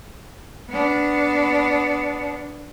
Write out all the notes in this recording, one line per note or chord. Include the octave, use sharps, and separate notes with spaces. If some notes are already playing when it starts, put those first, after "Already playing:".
B3 D4